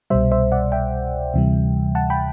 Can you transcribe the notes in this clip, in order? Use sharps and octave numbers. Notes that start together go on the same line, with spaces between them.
C2 B2 G3 C5 E5
C5 E5
D5 F#5
E5 G5
D2 C3 E3 G3
F#5 A5
G5 B5